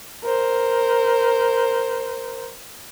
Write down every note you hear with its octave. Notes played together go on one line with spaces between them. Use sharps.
A#4 C5